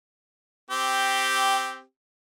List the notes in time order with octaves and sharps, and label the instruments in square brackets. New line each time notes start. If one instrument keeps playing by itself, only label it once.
[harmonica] C4 G4